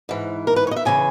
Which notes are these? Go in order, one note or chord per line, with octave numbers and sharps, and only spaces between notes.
G#2 E3
A#4
B4
C#5
D#5
E5
D#2 C#3 E3 G#5